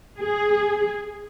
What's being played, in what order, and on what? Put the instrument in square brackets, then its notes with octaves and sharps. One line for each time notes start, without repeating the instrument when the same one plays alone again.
[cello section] G#4